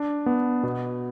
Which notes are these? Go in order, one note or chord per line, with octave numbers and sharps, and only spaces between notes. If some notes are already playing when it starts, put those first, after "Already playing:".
Already playing: D4
B3
B2